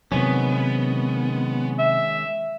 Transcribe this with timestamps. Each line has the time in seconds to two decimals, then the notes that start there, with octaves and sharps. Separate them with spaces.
0.12 C3 D#3 F#3 G#3 B3 C#4
1.79 E5